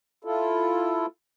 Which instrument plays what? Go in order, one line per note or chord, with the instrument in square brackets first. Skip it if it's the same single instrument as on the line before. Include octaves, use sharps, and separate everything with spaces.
[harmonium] E4 F4 A4